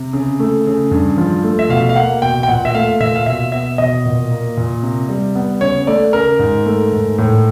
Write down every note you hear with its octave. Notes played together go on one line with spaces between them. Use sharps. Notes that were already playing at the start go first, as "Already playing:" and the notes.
Already playing: C3
C#3
A3
C#3
G2
F3
A3
E5
B2 F5
F5
A#3 F#5
B2 G5
G5
A#2 F#5
E5
A3 F5
A#2 E5
F5
B2 E5
B3 E5
B2 D#5
A#2
A#3
A#2
C3
G3
B3
C#3 C#5
A3 D5
C#3 A#4
G#2
A3
G#2
A2